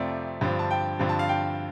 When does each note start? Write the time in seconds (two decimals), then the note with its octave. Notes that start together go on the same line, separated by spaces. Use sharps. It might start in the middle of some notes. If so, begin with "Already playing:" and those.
Already playing: F2 C3 F3 A3 C4 D5
0.41 G2 D3 F3 C4
0.59 A5
0.71 G5
0.99 G2 D3 F3 C4
1.09 A5
1.19 F5
1.29 G5